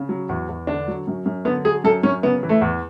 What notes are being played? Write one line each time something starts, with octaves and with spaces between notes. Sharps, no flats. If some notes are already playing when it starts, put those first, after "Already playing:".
Already playing: C#3
F#3
E2
E2
D3 D4
F#3
F#2
F#2
D3 B3
F#3 G#4
F#2 A4
F#2 C#4
C#3 B3
E3
A3
E2